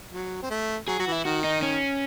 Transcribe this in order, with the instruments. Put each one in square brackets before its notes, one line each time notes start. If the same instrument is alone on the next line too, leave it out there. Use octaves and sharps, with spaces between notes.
[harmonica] F#3
C4
A3
[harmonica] F#3 [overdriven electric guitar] G#4
[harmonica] F#3 [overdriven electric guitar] F#4
[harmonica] E3
[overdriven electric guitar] E4
[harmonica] D#3 [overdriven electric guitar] F#4
[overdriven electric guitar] D#4
C#4